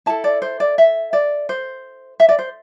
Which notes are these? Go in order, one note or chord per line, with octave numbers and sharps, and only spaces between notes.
E4 A4 A5
D5
C5
D5
E5
D5
C5
E5
D5
C5